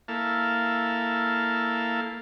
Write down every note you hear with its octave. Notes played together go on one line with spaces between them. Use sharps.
A#3 E4 A4 F5